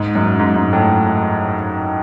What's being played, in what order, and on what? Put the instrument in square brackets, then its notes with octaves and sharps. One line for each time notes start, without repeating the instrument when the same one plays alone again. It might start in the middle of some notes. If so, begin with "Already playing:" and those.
Already playing: [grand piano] G#2
F#2
G#2
G#2
A2